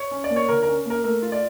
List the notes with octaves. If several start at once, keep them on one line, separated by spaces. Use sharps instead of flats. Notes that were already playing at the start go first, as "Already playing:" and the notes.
Already playing: C#5
C#4
D5
A#3
C#5
D3 A#4
C#4 A#4
A#3 A#4
A3 A#4
F4
D5